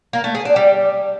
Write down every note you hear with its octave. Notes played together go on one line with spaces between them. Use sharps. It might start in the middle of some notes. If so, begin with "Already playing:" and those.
A#3
A3
G#4
D4
G3